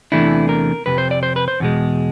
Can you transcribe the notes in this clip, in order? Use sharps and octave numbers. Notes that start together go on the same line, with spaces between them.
E2 C3 E3 A3 D4 E4
A#4
F2 C3 B4
C5
D5
C5
B4
C5
E2 B2 G#3